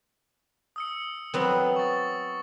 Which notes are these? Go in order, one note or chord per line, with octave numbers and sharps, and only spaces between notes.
D#6 E6 C#7
F#3 B3 C4
C#6 A6